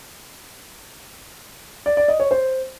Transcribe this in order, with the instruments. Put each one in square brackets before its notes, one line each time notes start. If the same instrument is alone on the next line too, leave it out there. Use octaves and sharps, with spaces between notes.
[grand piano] D5
D5
D#5
C#5
C5